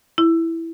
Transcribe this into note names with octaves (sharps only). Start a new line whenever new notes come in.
E4